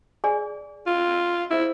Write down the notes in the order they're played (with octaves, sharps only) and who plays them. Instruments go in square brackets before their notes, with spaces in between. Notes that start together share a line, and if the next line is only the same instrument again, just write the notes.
[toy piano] G#4 D5 G#5
[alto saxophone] F4
[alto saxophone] E4 [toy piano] G#4 C5 E5